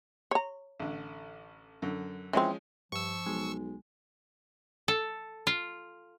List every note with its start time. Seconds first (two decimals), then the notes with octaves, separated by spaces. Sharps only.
0.31 C#5 A#5
0.80 A1 D3
1.82 F#2 D3
2.33 E3 F3 G#3 C4 C#4
2.92 G2 F3 C#6 E6
3.26 B1 G#3
4.88 A4
5.47 F4